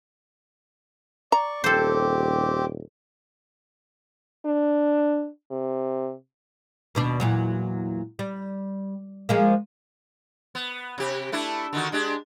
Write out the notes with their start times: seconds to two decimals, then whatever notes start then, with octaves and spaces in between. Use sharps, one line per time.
1.32 D5 A#5 C#6
1.64 D#1 C4 G4 A4 C5 D6
4.45 D4
5.51 C3
6.95 D#2 B2 D4
7.20 E2 A#2 F#3
8.19 G3
9.29 F3 G#3 A#3
10.55 B3
10.98 C3 G4
11.32 A3 D4 E4
11.73 D3 D#3 F#4
11.92 G#3 D4 G4